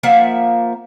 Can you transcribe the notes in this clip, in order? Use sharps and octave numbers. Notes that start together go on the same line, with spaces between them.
F3 A#3 E5 F#5